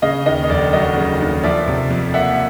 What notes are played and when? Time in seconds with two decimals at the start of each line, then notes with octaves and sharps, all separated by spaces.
0.02 C#3 D#5 F5
0.26 D#2 D#5
0.44 D#5
0.49 F1 D5
0.73 F#3 D#5
0.97 C#3
1.21 D#2
1.44 F3 D5 E5
1.68 C3
1.90 F2
2.14 A#3 E5 F#5